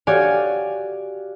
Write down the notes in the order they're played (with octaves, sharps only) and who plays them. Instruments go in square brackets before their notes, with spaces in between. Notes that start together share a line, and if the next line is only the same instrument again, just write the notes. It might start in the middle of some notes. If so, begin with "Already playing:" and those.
[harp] F#4 G4 C#5 D5 F5 G#5